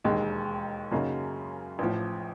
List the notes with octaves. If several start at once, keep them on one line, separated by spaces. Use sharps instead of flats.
E1 D#2 D#3 G#3
F#2 C#3 F#3 A#3 D#4
A1 A2 F3